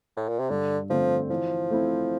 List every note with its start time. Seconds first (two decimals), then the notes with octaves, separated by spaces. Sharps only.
0.17 A2
0.28 A#2
0.39 C3
0.50 G2 D3
0.90 D3 F3 A3 C4
1.30 E3 F3
1.70 A3 C4 E4